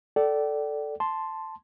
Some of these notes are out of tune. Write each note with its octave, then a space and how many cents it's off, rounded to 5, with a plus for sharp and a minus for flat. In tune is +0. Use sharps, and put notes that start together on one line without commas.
A4 +0 D5 -5 G5 -40
A5 +0 C6 +0